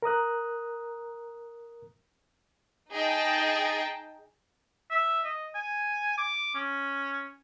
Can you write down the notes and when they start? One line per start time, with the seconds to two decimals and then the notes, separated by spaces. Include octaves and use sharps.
0.02 A#4 A#5 D#6 F#6
2.92 D#4 G#4 D#5 G5 A5
4.90 E5
5.25 D#5
5.55 G#5
6.17 D6
6.55 C#4